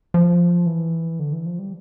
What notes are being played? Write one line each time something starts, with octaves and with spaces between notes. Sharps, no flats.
F3
E3
D3
E3
F3
G3